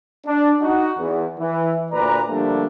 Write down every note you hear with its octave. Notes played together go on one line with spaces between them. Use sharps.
D4
D#4 F#4
E2
E3
D2 A#2 B4 D5 A#5
D3 F3 G3 A3 A#3 D4